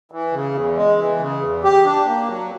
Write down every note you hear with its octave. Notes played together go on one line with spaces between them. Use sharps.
E3
C#3
E2
G#3
E3
C#3
E2
G4
D4
A#3
F#3